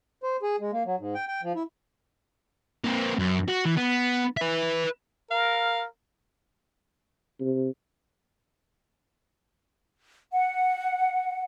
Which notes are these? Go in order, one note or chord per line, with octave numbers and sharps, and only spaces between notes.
C5
G#4
G#3
A#3
F#3
G#2
G5
G5
F3
E4
A#3 C4
F#2
F#4
E3
B3
B4 E5
A#4 F5
C3
F#5